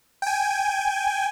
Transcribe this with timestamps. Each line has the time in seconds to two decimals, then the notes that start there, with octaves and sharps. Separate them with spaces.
0.22 G5 G#5